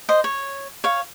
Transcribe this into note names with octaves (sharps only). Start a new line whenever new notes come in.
C5 D#5
C#5
C#5 F5